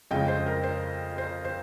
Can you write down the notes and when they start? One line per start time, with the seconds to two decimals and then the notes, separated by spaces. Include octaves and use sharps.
0.11 F2 C#3 G#3 C#4 D#5 G5
0.28 C5
0.46 A#4
0.63 C5
1.18 C5
1.45 C5